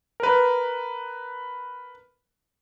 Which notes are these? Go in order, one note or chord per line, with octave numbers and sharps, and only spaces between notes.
A#4 B4